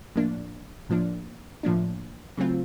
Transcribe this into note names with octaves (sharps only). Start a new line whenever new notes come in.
A2 F3 A#3 D4
A2 F3 A#3 D4
A2 F3 A#3 D4
C#3 F#3 A3 C4 F4